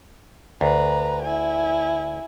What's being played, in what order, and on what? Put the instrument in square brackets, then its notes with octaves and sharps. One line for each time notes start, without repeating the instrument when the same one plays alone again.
[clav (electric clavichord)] D2 [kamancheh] B4 A#5
[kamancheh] E4 G#5